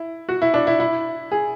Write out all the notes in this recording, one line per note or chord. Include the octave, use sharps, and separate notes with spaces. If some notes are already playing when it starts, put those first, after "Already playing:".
Already playing: E4
F#4
E4
D4
E4
E4
G#4